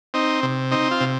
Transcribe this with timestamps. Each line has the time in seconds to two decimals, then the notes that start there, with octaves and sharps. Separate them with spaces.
0.14 C4 D#4
0.43 C3
0.71 C4 D#4
0.91 F4
1.01 C3